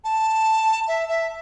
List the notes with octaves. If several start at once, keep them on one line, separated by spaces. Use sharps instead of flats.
A5
E5
E5